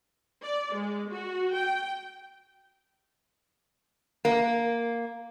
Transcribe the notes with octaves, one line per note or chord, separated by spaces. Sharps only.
D5
G#3
F#4
G5
A#3